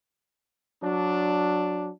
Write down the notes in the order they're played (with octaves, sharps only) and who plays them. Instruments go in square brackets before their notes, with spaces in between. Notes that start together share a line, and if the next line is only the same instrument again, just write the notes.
[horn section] F#3 D4